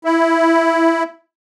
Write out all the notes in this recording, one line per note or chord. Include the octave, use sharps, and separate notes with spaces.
E4